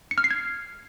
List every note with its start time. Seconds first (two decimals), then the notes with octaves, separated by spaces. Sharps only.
0.11 C#7
0.18 F6
0.24 C7
0.31 G#6